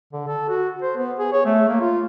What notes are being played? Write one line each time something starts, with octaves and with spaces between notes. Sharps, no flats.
D3
A4
F#4
C5
B3
G#4
C#5
A3
A#3
F4